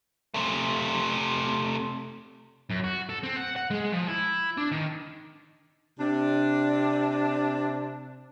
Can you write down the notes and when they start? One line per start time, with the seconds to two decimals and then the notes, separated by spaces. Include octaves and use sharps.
0.34 C3 A3
2.70 F#2
2.84 F#4
3.09 A4
3.23 C4
3.36 F#5
3.56 F#5
3.71 G#3
3.93 F3
4.08 E4
4.57 D4
4.71 D#3
5.99 C3 D4